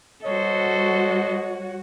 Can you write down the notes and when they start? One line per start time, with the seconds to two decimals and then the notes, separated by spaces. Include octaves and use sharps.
0.24 G3 F#4 A4 C5 C#5 D#5